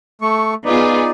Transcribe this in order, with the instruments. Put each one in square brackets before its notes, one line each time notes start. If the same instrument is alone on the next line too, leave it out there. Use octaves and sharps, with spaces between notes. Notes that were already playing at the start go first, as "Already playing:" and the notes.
[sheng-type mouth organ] A3 C#6
[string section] B3 F4 G#4 [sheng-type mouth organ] D#4 D5